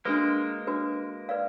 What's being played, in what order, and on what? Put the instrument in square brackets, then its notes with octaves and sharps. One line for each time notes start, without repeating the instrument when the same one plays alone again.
[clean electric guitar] G#3 A#3 [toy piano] D4 F#4 B4
[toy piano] D4 F#4 B4
B4 D5 F5